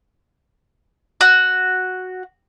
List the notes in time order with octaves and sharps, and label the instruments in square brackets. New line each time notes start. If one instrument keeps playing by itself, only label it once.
[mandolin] F#4